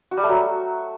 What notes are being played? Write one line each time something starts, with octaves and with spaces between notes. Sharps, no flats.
F#4
G3
A3
F#3